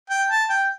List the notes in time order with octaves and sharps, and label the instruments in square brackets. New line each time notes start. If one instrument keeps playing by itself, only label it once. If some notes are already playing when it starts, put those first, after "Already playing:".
[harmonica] G5
A5
G5